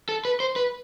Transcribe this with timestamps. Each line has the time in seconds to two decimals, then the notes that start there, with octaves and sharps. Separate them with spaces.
0.09 A4
0.25 B4
0.40 C5
0.56 B4